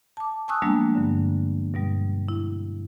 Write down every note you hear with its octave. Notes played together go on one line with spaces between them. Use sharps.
A5 D6
G#5 A5 C#6 D#6 E6 F#6
F3 G3 G#3 A#3 B3 D4
G2 D3
G2 B2 G3
E4